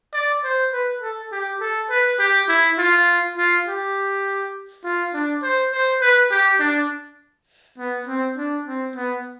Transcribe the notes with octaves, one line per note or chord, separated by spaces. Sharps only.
D5
C5
B4
A4
G4
A4
B4
G4
E4
F4
F4
G4
F4
D4
C5
C5
B4
G4
D4
B3
C4
D4
C4
B3